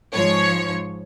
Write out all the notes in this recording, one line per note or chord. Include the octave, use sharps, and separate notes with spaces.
G#2 F3 C#5